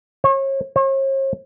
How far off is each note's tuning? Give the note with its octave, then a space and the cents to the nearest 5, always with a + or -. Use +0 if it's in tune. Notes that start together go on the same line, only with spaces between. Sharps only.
C#5 -35
C#5 -45